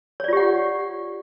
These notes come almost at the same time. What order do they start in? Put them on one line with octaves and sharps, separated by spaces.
C#5 D5 F4 G4 F#5